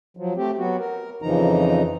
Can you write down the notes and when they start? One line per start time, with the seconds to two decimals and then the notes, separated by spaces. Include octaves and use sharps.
0.17 F3 F#3
0.36 A3 C4 G4
0.58 F#3 B3 F#4
0.79 A#4
1.22 F2 C#3 E3 F3 D#4 A#5